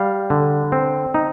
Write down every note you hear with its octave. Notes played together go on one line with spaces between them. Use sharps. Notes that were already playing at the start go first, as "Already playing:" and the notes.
Already playing: G3 F5
D3
C4
D#4